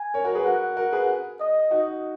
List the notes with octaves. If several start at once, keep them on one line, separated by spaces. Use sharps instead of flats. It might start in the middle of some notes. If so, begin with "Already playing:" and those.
Already playing: G#5
A#4 C#5
F#4 A#4
G#4 B4
F#4 A#4 F#5
F#4 A#4
G#4 B4
D#5
D#4 F#4